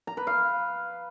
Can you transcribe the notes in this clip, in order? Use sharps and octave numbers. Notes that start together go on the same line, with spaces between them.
A#5
B4
F5